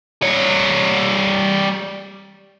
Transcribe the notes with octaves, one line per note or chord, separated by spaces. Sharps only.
G3 C#5